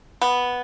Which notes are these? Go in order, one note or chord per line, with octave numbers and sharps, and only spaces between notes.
B3